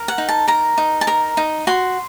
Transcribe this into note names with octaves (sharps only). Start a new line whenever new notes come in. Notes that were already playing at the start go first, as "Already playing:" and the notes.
Already playing: A#4
F#5
D#4
A5
A#4 A#5
D#4
A5
A#4 A#5
D#4
F#4 C6